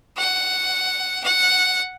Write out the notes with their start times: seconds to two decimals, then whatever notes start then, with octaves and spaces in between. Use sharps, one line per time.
0.18 F#5
1.24 F#5